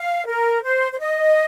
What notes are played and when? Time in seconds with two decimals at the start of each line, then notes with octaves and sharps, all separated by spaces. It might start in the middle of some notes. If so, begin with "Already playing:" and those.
Already playing: F5
0.27 A#4
0.63 C5
0.92 C5
0.99 D#5